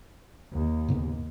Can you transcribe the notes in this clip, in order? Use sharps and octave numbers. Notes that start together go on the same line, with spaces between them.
D#2
G#2 C#3 B3